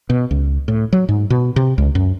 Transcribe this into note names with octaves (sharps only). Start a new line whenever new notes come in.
B2
C#2
A2
F#3
G#2
B2
C3
C#2
F#2